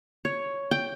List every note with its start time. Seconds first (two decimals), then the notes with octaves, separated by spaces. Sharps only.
0.25 C#5
0.71 G5